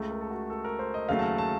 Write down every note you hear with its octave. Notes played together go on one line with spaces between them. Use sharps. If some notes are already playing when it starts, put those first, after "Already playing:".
Already playing: C#2 C#3 A3
A#4
A4
F#4
A4
A#4
C5
D#5
D#2 C#3 F#3 A3 F5
A5
F#5
A5